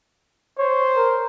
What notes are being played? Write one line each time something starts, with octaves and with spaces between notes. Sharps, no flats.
C5 C#5
A#4